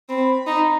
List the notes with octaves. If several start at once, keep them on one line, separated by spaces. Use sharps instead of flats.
C4 B5
D#4